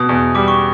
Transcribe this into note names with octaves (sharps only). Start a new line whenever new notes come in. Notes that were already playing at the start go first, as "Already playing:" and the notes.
Already playing: B2 D#6
E2
G3 D6
C#6